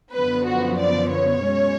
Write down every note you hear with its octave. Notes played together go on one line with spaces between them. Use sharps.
F#2 D3 F3 B3 B4
F#4
D5
C#5
B2 G#3 C#4